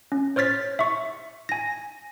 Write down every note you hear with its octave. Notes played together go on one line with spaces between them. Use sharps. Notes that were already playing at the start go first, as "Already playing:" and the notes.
C#4
C5 C#5 F6 A6 B6
E5 C#6
G#5 A#6